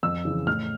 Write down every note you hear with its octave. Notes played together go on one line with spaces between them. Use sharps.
F2 E6
C#3 E3
A2 F6